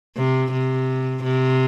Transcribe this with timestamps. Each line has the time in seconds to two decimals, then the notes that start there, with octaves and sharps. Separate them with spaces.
0.17 C3
0.52 C3
1.23 C3